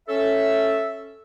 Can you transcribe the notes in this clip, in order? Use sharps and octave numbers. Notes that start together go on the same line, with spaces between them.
C#4 A4 E5